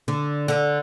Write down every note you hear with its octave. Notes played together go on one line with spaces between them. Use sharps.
D3
D3